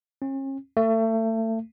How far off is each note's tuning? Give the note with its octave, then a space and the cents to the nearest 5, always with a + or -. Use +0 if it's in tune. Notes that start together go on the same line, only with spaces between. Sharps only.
C#4 -40
A3 +30